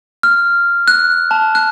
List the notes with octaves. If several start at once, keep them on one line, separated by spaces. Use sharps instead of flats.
F6
F#6
A5
F#6